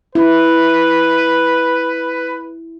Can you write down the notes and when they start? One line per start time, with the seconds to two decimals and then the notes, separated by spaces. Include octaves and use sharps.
0.15 E4 B4